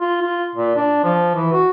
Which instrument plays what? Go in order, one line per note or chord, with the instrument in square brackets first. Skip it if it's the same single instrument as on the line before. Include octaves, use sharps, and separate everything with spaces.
[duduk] F4
F4
A#2
D4
F3
E3
F#4